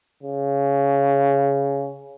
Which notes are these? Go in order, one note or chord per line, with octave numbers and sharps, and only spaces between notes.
C#3